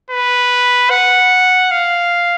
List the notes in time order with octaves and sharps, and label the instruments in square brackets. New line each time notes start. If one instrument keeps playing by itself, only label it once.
[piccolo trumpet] B4
F#5
F5